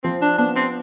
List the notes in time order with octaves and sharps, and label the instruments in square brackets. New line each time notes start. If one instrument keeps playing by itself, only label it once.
[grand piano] F3 [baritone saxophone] C4
[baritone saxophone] D4
[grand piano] B3 [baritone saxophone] D4
[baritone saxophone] C4